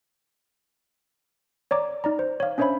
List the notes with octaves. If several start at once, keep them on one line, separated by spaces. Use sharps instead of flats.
C#5 D5 A#5 D6
D#4 D5 A#5
C5
C#5 F5
C#4 D4 C5 C#5 E5 B5